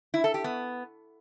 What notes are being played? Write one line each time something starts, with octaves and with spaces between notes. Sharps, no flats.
E4
A4
G4
B3